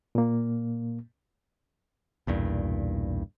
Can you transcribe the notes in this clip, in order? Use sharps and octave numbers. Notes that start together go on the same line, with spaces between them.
A#2 A#3
B1 E2 G2 A#2